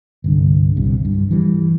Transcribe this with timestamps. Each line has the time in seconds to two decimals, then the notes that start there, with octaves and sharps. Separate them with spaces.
0.24 G1 C2 D3
0.76 D#1 C2 C3
1.05 G2
1.31 E3 G3